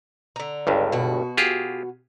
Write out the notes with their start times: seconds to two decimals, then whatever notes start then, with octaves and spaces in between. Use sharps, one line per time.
0.36 D3 A#5
0.67 G1 C#2 G2
0.92 B2 F#4
1.37 F4 G4 G#4